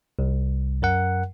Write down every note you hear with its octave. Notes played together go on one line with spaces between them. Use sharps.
C2
F#2 A#4 F#5